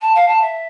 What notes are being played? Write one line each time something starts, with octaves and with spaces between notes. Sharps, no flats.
A5
F5
A5
E5